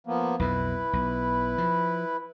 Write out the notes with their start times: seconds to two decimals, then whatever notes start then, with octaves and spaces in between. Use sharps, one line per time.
0.07 F3 A#3 B3
0.39 B1 F2 B2 E4 B4
0.93 B1
1.58 F3